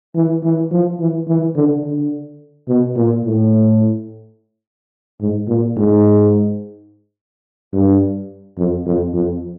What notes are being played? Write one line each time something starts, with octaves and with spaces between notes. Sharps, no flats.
E3
E3
F3
E3
E3
D3
D3
B2
A#2
A2
G#2
A#2
G#2
G2
F2
F2
F2